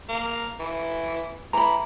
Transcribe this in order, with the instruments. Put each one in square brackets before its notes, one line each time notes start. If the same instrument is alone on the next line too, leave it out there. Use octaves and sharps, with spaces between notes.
[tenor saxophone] A#3
E3
[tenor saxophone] E3 [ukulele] A#5 B5